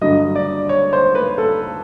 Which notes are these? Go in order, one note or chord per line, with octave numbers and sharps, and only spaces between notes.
G2 D3 F#3 D#5
D5
C#5
C5
B4
A4